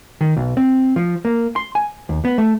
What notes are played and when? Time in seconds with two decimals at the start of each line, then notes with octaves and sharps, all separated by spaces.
0.21 D#3
0.36 B1
0.57 C4
0.96 F3
1.25 A#3
1.56 C6
1.75 G#5
2.09 D#2
2.25 B3
2.38 A3